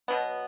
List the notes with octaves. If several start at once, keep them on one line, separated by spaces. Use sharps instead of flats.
B2 F#3 B3